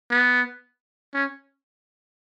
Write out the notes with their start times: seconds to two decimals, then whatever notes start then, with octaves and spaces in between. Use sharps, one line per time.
0.11 B3
1.14 C#4